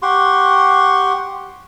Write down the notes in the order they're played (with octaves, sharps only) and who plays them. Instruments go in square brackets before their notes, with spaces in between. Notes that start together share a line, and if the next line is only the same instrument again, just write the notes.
[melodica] G4 F#5 C6 C#6